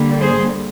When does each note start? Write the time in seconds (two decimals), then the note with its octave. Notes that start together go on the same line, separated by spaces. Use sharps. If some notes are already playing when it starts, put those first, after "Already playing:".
Already playing: D3 G3 A#3
0.21 G#4 C5